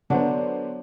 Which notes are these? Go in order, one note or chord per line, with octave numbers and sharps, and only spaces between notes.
D3 F#3 B3 D4 C5